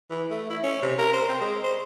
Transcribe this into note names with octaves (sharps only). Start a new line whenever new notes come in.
E3
A3
E4
C#4
C3
A#4
C5
C4
G#3
C5